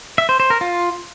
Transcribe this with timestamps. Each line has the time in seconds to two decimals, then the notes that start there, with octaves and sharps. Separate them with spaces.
0.18 E5
0.29 C5
0.40 C5
0.50 A#4
0.61 F4